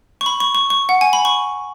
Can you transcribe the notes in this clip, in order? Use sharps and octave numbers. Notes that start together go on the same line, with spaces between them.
C#6
B5
C#6
C#6
C#6
F#5
G#5
B5
C#6